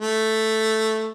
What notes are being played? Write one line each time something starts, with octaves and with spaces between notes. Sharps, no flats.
A3